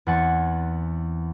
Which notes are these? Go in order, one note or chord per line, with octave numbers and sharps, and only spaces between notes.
E2 C4 F#5 G#5 A6 C#7